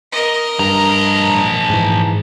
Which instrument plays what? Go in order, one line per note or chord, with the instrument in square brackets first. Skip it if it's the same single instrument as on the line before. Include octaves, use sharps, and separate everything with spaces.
[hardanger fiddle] A#4 D#5
[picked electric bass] G2 [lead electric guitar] F3 A#5
[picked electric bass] G#2 E3